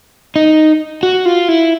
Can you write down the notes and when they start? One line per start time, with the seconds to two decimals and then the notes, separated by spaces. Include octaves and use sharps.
0.36 D#4
1.03 F#4
1.26 F4
1.49 E4